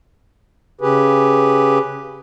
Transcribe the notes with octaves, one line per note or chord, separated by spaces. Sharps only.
C#3 G4 G#4 B4